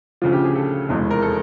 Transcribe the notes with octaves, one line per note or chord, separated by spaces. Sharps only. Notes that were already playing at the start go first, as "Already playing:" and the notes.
D2 C#3 F3 F4
G4
G#4
A4
F1 E2 B2 G#3
A#4
A4